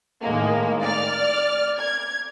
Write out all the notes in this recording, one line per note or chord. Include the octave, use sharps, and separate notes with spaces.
A2 D#3 G#3 A#3
D5 F6
G#6